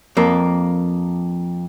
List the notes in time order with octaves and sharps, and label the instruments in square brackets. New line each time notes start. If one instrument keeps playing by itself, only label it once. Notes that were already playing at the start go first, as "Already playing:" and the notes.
[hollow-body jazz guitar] F2 A#3